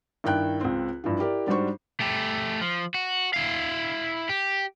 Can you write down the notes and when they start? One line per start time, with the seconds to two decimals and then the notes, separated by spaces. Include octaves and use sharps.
0.24 G2 D#3 E4 G5 F#6
0.61 C#2 C4
1.04 G2 E3 F3
1.19 E4 G4 A#4 D5
1.47 G#2 G3 D4 F#4 C5 C#6
2.00 A3 G4
2.61 F3
2.94 F#4
3.34 E4 F5
4.29 G4